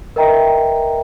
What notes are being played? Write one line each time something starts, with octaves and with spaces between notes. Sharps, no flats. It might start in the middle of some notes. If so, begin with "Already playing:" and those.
A#4 B4 D#5 E5 G5 A#5